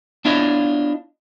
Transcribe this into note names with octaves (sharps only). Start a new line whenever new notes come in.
B3 D4 E4 F4 C#5 D#5